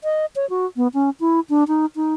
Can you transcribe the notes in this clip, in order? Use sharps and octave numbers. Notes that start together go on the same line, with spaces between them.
D#5
C#5
F#4
B3
C#4
E4
D4
D#4
D#4